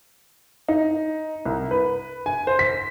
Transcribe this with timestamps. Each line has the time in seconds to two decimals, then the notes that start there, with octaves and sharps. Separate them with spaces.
0.69 D#4
1.46 C2
1.71 B4
2.26 G#5
2.47 C5
2.59 B6